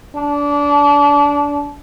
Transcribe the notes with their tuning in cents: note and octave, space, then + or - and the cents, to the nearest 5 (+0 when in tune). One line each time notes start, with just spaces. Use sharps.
D4 -25